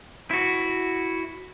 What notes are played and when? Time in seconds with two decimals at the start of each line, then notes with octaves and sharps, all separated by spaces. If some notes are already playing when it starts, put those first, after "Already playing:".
0.31 E4 F#4